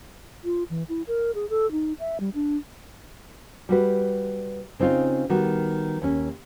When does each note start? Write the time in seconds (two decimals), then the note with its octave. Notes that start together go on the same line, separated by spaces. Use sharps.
0.44 F4
0.70 E3
0.89 E4
1.07 A#4
1.35 G#4
1.50 A4
1.72 D#4
1.99 E5
2.20 G3
2.34 D4
3.69 G3 F#4 B4
4.80 C#3 C4 D#4 F4
5.30 D#3 G3 B3 F#4
6.02 D#2 C#4